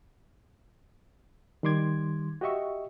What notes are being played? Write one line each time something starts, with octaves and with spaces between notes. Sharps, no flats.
D#3 G3 C6 D6 G#6
F#4 G4 D#5 E5 C#6